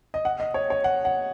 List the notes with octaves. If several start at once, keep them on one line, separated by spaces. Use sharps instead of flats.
D#5
F#5
D#5
C#5
C#5
F#5
F#5